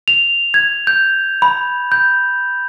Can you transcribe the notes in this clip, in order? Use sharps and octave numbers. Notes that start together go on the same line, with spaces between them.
F7
G#6
G6
B5
G6